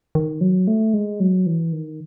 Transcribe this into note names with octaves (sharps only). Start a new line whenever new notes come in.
D#3
F#3
A3
G#3
F#3
E3
D#3